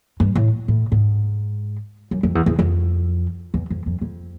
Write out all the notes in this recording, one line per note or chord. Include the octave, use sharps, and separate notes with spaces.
G2
A2
A2
G#2
F#2
F2
E2
E2
F2
E2
F2
F2
F2